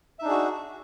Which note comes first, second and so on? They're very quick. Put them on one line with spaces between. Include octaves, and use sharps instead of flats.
E5 D#4 D4 G#4 F#4